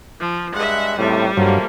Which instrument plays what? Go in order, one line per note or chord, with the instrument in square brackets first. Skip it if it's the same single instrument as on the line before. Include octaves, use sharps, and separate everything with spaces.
[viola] F3
[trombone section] G2 G#3 [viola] E5 F#5
[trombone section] C#2 C3 C4 [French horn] A2 [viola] G3
[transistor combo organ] G2 [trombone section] F3 A3 A#3 [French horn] F#3